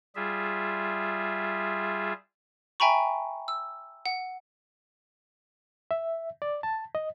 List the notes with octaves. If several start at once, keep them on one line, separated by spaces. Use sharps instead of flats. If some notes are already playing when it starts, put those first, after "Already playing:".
G3 F4 G#4 E5
E5 G5 G#5 A#5 B5 C#6
E6
F#5
E5
D5
A5
D#5